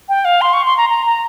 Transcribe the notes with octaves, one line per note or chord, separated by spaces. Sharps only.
G5
F5
C6
C#6
C6
A#5
A#5
A#5